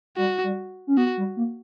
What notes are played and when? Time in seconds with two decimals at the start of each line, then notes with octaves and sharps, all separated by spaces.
0.17 G3 F#4
0.44 G3
0.87 C#4
0.97 B3 F#4
1.17 G3
1.37 A#3